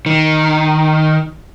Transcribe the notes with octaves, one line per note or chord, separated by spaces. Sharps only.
D#3